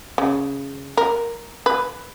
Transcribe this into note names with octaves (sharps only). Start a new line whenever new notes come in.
C#3
A#4
B4